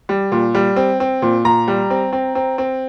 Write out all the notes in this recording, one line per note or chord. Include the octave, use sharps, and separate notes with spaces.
G3
A#2
G3
C4
C4
A#2
A#2 A#5
G3
C4
C4
C4
C4